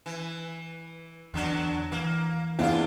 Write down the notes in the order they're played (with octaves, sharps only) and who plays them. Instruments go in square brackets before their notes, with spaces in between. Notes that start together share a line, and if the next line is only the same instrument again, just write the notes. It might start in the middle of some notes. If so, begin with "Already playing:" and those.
[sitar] E3
[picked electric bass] E2 [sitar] D3 F#3 D4
[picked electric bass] E3 [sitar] A#3
[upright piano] E2 F5 [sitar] D4 E4 F4